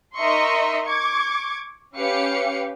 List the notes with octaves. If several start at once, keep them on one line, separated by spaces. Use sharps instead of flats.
D#4 A#4 D#5 E5 C6 C#6
C#6 D6 G#6
C#4 G4 B4 F5 C#7